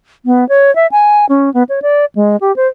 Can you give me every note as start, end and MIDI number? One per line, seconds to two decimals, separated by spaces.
0.25 0.47 59
0.49 0.74 73
0.75 0.87 76
0.92 1.25 80
1.29 1.52 61
1.54 1.63 59
1.69 1.80 73
1.82 2.05 74
2.15 2.36 56
2.41 2.55 67
2.56 2.67 72